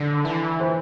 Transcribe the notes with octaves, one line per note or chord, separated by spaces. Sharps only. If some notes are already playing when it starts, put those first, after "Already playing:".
Already playing: D3
E3
C5